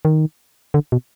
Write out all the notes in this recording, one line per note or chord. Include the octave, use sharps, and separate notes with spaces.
D#3
D3
B2